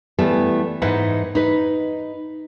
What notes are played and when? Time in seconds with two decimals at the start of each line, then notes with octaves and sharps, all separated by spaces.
0.18 E3 G3 A3 B3
0.82 G#2 E3 D#4 B4 F#5
1.35 D#4 B4